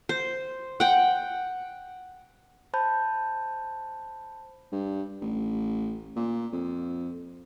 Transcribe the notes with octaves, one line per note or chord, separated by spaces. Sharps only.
C5
F#5 G5
C5 A5 B5 G6
G2
A1
A#2
F2